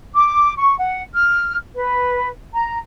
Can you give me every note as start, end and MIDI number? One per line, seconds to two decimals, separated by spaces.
0.14 0.53 86
0.56 0.76 85
0.78 1.03 78
1.14 1.56 89
1.74 2.28 71
2.53 2.78 82